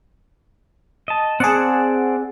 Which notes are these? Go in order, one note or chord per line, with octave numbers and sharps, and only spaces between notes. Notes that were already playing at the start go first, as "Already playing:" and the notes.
D#5 A5
C4 G#4 D5 F#5 A5